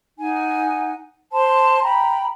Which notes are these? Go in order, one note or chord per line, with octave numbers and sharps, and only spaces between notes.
D#4 F#5 G#5
C5 A5 C6
G5 A#5 B5